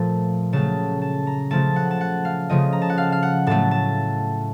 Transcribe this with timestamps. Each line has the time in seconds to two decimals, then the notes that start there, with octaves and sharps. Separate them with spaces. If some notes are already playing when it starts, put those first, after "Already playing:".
Already playing: A#2 F3 A3 A5
0.53 C#3 F#3 A3 A5
1.02 A5
1.27 A#5
1.51 C#3 F3 A3 A5
1.76 F#5
1.91 A5
2.01 F#5
2.25 F5
2.49 C#3 F3 A3 D#5
2.73 A#5
2.82 A5
2.89 F#5
2.98 F5
3.12 F5
3.23 F#5
3.47 A2 F#3 A3 A5
3.71 A5